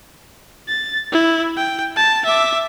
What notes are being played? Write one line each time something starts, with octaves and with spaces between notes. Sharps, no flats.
A6
E4
G5
A5
E5 D6